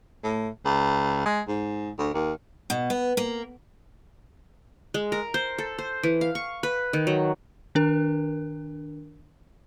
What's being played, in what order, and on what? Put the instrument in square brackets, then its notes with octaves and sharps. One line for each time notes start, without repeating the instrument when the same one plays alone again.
[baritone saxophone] A2
C#2
G#3
G#2
D2
D#2
[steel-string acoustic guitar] B2
B3
A#3
[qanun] G#3
A#4
C5
A4
C5
E3
F5
C#6
B4
D#3
F#3
[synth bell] D#3 D4 A#4